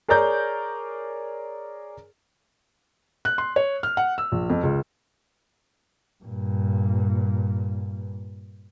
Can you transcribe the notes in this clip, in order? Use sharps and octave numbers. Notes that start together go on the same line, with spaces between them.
G#4 A#4 C#5 D5 A#5 G6
F#6
C6
C#5
F6
F#5
E6
A#1
F2
C#2
G2 A#2